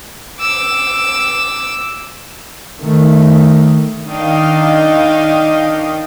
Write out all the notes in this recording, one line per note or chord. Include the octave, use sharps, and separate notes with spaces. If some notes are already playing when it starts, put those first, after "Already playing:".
D6 E6
D#3 A3
D#3 D4 D#5 F5 G5